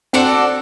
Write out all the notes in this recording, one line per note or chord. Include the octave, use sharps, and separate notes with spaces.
C4 D4 F#4 A4 D5